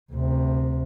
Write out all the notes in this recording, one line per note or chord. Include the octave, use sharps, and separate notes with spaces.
D2 C3